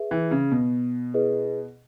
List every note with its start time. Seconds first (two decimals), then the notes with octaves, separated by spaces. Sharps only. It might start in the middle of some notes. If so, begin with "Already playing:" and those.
Already playing: G#4 B4 E5
0.11 E3
0.31 C#3
0.52 B2
1.14 E4 G#4 B4 D#5